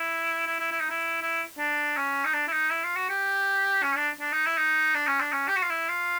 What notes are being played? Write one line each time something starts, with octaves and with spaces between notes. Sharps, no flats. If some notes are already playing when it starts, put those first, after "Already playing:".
Already playing: E4
E4
E4
E4
D#4
E4
E4
D4
C#4
D#4
D4
E4
D#4
E4
F4
F#4
G4
C#4
D4
D4
D#4
E4
D#4
D4
C#4
D4
C#4
G4
F#4
F4
E4
F4